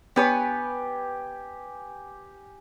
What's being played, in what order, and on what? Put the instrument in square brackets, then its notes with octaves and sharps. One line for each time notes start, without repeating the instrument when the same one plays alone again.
[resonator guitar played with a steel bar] B3 B4 C#5 [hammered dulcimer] G4 G#5